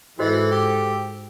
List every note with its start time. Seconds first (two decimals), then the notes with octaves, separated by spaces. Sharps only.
0.19 G#2 E3 F#4 A4 C5 D#5
0.51 G4